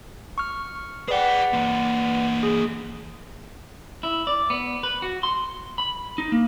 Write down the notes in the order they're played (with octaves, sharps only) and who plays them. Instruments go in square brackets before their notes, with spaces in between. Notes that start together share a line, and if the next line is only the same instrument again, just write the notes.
[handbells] C#6 F6
[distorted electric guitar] G#4 G5 [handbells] B4 D5 F#5
[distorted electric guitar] E3 A#3
[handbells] G#4
[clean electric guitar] E4
D5
B3
B4
F#4
C6
B5
D#4
A#3